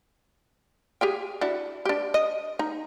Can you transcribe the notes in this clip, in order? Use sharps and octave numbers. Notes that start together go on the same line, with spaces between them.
G4 G#4 G5
D4 E4 F#4
D4 G4
D#5
D#4